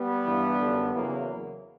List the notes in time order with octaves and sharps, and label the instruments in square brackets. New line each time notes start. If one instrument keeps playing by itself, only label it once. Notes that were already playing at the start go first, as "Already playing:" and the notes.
Already playing: [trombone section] G3 B3
G2 E3
F#2 D3
E2 C#3 E3 F#3 A#3